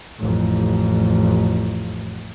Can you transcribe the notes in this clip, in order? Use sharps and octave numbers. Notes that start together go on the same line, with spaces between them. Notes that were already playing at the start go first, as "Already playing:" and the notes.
A1 F2